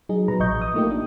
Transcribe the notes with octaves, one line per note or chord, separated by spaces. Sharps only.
F#3 D#4 G#4
B2 F#3 B4 A#5
A1 F3 D#5 C#6 G6
D#6
A3 A#3 D#4 F4 G4
D4